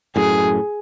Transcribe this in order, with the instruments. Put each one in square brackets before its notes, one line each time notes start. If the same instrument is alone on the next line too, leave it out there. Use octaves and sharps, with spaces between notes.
[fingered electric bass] F#2 A2 [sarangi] G#4